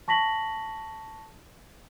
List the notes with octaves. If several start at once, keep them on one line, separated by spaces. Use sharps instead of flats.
A5 C#6 A#6 B6 F#7